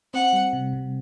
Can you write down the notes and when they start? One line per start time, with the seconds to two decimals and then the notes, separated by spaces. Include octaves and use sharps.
0.14 C4 F#5
0.33 G3
0.53 C3
0.73 C3